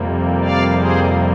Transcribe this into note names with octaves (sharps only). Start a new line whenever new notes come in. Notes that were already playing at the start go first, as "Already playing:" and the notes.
Already playing: F2 C3 G3 A#3
D5 F5
G#4 C5